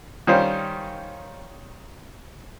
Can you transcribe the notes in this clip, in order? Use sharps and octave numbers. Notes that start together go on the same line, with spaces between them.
D#3 G3 C#4 D#4 F4 C5